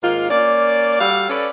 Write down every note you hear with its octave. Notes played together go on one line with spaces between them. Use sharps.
G#2 D#3 A#3 F4
A#3 C#4 D5
G3 F#4 A4 D5 F5
C#4 A4 B4 D5